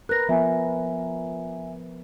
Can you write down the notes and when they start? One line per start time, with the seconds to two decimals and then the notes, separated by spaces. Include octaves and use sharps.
0.09 A#4 B4 F#6 A#6
0.29 F3 B3 E5 G#5